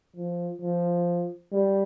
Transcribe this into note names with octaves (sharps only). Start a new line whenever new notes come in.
F3
F3
G3